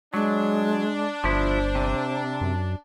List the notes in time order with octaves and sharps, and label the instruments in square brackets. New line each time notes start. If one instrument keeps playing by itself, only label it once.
[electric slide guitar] F#3 [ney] G#3 [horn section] D4
[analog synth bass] G1 [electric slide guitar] F3 E4 [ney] C5
[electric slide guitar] C3
[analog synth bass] F#2